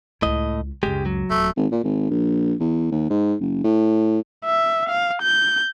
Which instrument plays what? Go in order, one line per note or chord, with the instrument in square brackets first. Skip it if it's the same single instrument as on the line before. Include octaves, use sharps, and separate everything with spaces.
[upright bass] C#2 E4 [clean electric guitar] A2 D#5
[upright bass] C#2 F#2 [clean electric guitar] G#3 G4
[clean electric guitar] F#3
[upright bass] D#1 [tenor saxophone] A3
[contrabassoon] G#1
A#2
G#1
A#1
E2
D#2
G#2
F#1
A2
[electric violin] E5
F5
G6